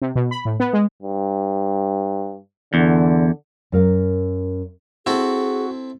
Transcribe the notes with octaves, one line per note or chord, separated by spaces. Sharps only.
C3
B2
B5
A2
B3
G#3
G2
E2 D3
F#2 A#4 F5
C4 E4 F#4 G#4 A4